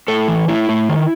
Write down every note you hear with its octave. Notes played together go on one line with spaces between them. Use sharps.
A2 A4
E3
A2 E4
A2
D#3